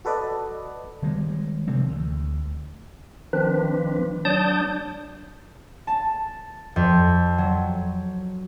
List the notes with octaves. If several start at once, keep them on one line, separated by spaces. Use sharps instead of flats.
F#4 A4 B4 D5 D#5
D#3 G3 G#3
C3 E3 F3 C4
D2
D#3 F3 C4 D4 B4
F#3 D4 D5 A5 D#6 G6
A5
F2
F#3